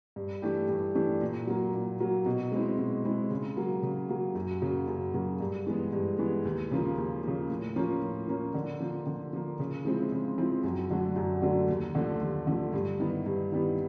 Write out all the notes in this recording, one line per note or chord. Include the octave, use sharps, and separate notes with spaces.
G2
E3 A3 D4 G4
G2
E3 A3 D4 G4
A#2
F#3 A#3
A#2
F#3 A#3
B2
G#3 C4 E4
B2
G#3 C4 E4
C#3
F#3 A#3
C#3
F#3 A#3
F#2
C#3 F#3 A#3
F#2
C#3 F#3 A#3
G2
E3 G#3 B3
G2
E3 G#3 B3
D#2
C#3 F3 A#3
D#2
C#3 F3 A#3
A2
F3 A#3 C#4
A2
F3 A#3 C#4
D3
F3 A#3
D3
F3 A#3
C#3
F3 G#3 C4 E4
C#3
F3 G#3 C4 E4
F#2
D3 F#3 A3 D4
F#2
D3 F#3 A3 D4
D#2
D3 F3 A3
D#2
D3 F3 A3
G2
D#3 G3 B3 E4
G2
D#3 G3 B3 E4